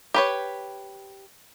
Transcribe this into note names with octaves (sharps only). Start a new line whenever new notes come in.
G4 B4 C#5